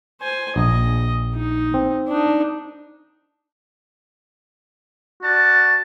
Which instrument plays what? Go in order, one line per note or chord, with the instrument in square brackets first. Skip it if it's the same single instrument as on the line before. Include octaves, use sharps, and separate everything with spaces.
[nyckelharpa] C5 G#5
[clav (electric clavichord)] A#1 [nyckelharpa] D#5
[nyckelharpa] D#4
[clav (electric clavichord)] C4
[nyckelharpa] D4 D#4
[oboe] F#4 [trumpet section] D5 A5